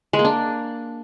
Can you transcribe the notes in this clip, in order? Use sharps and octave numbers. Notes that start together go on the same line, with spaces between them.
G#3
A#3
D4